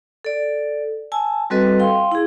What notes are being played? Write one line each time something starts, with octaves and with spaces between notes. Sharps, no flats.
A4 D5
G#5 A5 E6
G3 C4 F#4 A4 B4 D#5
F5 G5 C6
E4 G#4